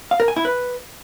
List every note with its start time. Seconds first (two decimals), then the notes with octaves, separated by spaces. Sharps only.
0.11 F5
0.20 A#4
0.28 G#5
0.36 E4
0.45 B4